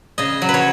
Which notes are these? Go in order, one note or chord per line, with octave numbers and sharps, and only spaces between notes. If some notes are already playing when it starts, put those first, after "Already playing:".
C#3 D#5
F#3
B4
C#5